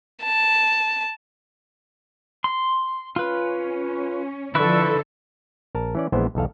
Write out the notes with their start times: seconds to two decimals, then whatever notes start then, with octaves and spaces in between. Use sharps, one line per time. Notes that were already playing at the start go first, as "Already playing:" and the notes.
0.23 A5
2.44 C6
3.16 C#4 F4 B4
4.55 D3 F3 E4 A4 B4 C#6
5.75 A#1 A#4 A5
5.95 E3 C#4 D5
6.12 A#1 E3 G#3 B3 C5
6.35 B1 E2 A4 F5